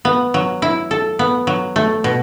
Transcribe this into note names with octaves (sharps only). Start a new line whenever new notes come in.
B3
F#3
E4
A4
B3
F#3
A3
B2